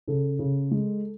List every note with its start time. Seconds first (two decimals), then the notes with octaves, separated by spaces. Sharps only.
0.08 C#3 A4
0.39 C#3
0.71 G#3